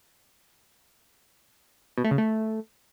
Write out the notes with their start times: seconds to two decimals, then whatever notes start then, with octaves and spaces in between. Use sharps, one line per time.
1.98 B2
2.04 A3
2.11 C#3
2.18 A3